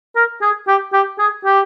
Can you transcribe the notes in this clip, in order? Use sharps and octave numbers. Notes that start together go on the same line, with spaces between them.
A#4
G#4
G4
G4
G#4
G4